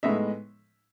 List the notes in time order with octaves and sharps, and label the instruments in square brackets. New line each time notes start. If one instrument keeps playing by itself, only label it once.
[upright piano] A2 G#3 B3 D#4 E5